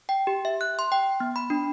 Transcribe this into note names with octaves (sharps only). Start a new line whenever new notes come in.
G5
G4
E5
F#6
C6
G5
B3
B5
D4